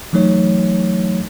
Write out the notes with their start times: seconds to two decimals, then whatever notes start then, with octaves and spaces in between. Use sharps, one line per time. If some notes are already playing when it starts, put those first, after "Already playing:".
0.13 E3 F#3 A3 D#4 C#5